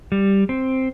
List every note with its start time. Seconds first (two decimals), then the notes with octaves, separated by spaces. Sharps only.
0.12 G3
0.49 C4